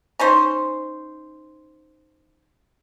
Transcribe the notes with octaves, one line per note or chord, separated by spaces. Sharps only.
C#4 D#4 C5